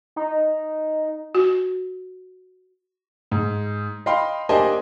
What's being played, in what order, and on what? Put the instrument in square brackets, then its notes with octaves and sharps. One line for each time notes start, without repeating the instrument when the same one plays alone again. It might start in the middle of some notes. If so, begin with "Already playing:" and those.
[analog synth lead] D#4
[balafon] F#4
[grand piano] G#2
D#5 F5 G5 B5 C6
A#3 D4 G4 C5 D#5 G#5